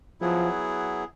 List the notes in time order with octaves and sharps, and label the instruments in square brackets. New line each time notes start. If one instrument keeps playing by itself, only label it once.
[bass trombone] F3 [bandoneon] F#3 B3 E4 G#4